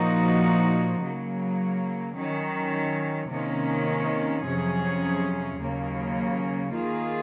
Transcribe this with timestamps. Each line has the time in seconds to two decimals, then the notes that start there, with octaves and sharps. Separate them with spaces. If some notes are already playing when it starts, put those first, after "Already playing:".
Already playing: A#2 F3 A#3 D#4 F#4
1.03 C#3 F#3 A#3
2.17 D#3 F#3 C#4
3.31 C3 D#3 A#3 C#4
4.45 F2 C3 F#3 C#4 G#4
5.59 D#2 C#3 F#3 A#3
6.73 D#3 A#3 F4 G#4